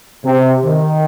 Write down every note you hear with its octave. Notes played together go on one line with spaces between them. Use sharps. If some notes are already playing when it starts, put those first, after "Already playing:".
C3
D#3